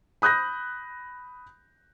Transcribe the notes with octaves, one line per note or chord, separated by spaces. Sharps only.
B5 D#6 F#6 G6 A#6